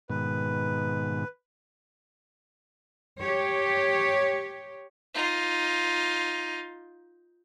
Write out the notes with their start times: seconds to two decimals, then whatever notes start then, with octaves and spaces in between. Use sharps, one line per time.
0.10 G#2 B2 D#3 B4
3.21 G4 C#5
5.14 D#4 F4